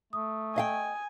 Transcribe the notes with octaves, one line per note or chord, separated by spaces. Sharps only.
A3 D#6
D#5 F5 G5 G#5